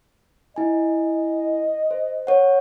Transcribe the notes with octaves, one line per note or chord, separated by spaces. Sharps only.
E4 D#5 G#5
C5
C#5 F#5